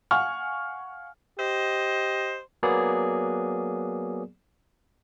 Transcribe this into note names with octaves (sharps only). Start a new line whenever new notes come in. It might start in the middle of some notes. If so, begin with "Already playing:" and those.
F5 F#5 G#5 C#6 F6
G4 C5 D#5
F#3 A#3 B3 G#4 D5